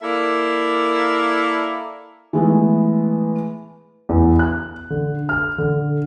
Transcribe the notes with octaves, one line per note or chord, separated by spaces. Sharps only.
A#3 E4 A4 A#4 D5 E5
E3 G#3 A3 B3
E2
F#6
D3
F6
D3